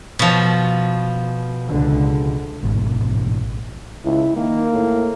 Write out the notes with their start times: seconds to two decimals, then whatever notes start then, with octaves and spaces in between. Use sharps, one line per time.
0.19 B2 F3
1.67 C#2 D3
2.63 A1 G#2 B2 E3
4.05 C#2 E4
4.36 D#3 A#3
4.72 A2